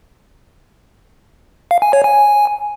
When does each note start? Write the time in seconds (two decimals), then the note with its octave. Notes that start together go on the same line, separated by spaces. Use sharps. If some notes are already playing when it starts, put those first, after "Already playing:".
1.71 F5
1.82 G#5
1.93 C#5
2.04 G#5